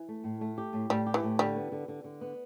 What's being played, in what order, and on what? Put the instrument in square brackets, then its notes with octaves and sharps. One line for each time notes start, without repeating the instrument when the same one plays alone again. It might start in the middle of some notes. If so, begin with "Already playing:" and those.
Already playing: [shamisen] E3
[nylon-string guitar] A3
A2
A3
G4
A2
[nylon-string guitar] A2 [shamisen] G3
[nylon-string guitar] G4
[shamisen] E3
[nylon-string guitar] A2
[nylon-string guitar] D3 [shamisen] G3
[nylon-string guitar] B3
D3
D3
D3
B3